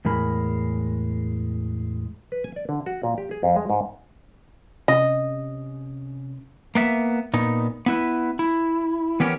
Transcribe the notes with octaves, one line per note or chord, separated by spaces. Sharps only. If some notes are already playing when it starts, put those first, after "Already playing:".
E2 A2 G#3 A#4 B5
B4
G#5
D5
D3
F#4
A#2
G4
G#4
F2
G#3
G#2
C3 C#4 D#5
A#3 B3 E5
A#2 B3 D#4
B3 E4 B4
E4
E3 B3 C#4 G4 A#4 C#5